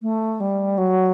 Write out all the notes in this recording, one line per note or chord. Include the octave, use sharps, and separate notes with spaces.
A3
G3
F#3